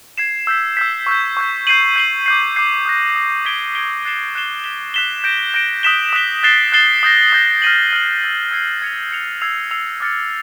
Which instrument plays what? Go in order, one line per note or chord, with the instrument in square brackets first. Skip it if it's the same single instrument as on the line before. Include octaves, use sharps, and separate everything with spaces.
[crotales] G#6 C7 E7
E6 G6 B6
E6 G6 B6
C#6 E6 G6
C#6 E6 G6
G6 C7 D#7 F#7
G6 C7 D#7 F#7
D6 G6 C7
D6 G6 C7
D#6 F#6 A#6
D#6 F#6 A#6
G#6 B6 D7 G7
G#6 B6 D7 G7
F#6 A6 C7 E7 G7
F#6 A6 C7 E7 G7
F#6 B6 E7 G7
F#6 B6 E7 G7
G6 A#6 D7
G6 A#6 D7
D#6 F#6 B6 E7 G7
D#6 F#6 B6 E7 G7
F#6 A6 C7 E7 G7
F#6 A6 C7 E7 G7
D#6 G6 A#6
D#6 G6 A#6
F6 A#6 D#7 F#7
F6 A#6 D#7 F#7
E6 G#6 C7
E6 G#6 C7
G#6 C#7 F7
G#6 C#7 F7
E6 G#6 C7 F7
E6 G#6 C7 F7
D6 F6 A6 C#7